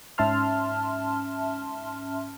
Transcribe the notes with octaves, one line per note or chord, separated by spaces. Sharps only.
G#2 C#4 E5 A5 C6 F6